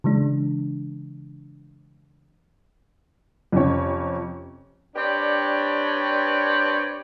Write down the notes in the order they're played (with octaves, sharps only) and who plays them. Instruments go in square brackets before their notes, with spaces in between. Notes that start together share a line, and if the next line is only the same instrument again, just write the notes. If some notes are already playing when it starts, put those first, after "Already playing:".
[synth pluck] C#3 E3 G#3 D4
[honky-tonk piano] F2 C3 C#4 C#5
[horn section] C4 D4 G4 B4 C#5 D5